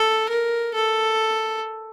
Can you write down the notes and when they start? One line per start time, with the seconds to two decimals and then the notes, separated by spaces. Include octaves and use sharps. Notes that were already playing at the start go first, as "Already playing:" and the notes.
Already playing: A4
0.29 A#4
0.74 A4